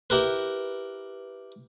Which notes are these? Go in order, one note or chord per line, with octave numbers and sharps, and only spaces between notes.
E4 G4 A#4 B4